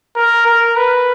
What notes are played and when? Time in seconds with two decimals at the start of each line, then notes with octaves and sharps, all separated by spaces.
0.16 A#4
0.46 A#4
0.76 B4